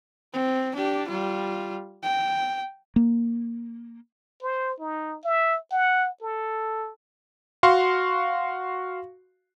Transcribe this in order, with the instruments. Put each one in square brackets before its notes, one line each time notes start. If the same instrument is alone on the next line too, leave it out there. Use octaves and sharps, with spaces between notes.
[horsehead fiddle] C4
D4 G4
G3 F4
G5
[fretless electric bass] A#3
[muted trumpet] C5
D#4
E5
F#5
A4
[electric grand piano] F#4 F5 C6 C#6